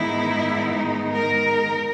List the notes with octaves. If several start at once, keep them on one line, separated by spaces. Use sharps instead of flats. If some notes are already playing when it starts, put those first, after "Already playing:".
Already playing: G#2 D#3 G#3 B3 D#4 E4
A#4